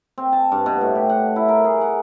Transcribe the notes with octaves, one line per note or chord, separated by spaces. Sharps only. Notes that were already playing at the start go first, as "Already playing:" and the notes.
C4
A5
G2
B2
A2
G4
F#5
E4
A#4
G#4
F#5